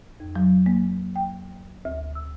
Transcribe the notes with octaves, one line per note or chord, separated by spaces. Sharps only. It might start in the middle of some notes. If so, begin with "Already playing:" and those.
F2
F#3
A#3
G5
D2
E6